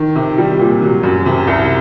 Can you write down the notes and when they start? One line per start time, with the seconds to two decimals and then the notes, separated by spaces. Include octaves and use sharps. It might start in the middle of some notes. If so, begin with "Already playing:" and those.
Already playing: D#3
0.15 C3
0.38 G3
0.59 A#2
0.82 F#3
1.03 F#2
1.25 C3
1.47 C2